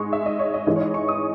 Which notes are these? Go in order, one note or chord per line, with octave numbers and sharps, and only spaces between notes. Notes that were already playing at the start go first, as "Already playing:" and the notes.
Already playing: G#2 G#3 C#6
E5
D#5
C#5
D#5
G#2 E3 G#3 E5
C#5
D#5
C#6
D#6